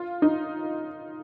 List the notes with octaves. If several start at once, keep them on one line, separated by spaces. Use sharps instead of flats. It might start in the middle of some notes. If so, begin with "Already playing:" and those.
Already playing: F4
D#4